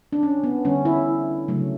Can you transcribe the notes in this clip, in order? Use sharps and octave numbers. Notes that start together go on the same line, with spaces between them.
D4
C#4
B3
D3 G3 C#4
E4
C#3 F#3 A3